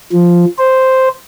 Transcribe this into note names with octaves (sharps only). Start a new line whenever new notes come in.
F3
C5